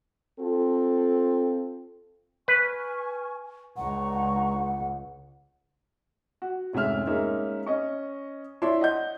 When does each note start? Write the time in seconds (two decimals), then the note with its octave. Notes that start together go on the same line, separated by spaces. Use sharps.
0.39 C4 F4 A4
2.48 B4 G#5 C#6 F6
3.77 C#2 D4 F#5 A#5 C#6
6.42 F#4
6.73 F1 G#2 C#4 G#4 E5 F6
7.07 G#3 A#3 C#4 D#4 E5
7.66 C#4 D#5 C#6
8.62 D4 E4 C#5 E5 C6
8.81 D#5 F#5 G6